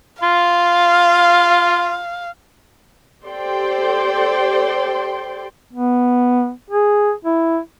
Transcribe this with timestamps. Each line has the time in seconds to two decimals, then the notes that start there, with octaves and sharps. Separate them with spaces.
0.23 F4 F5
3.25 G4 A4 C5 D5 G5 C6
5.73 B3
6.70 G#4
7.25 E4